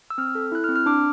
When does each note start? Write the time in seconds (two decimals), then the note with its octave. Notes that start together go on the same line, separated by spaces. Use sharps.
0.10 E6
0.18 C4 F6
0.35 A4
0.52 E4 F#6
0.64 F6
0.69 C4
0.76 F6
0.86 D4 D6